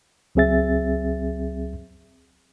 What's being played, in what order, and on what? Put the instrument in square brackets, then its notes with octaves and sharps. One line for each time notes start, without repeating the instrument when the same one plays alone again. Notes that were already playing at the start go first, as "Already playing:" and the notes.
[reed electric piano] C#2 F#3 C4 G#4 E5 A6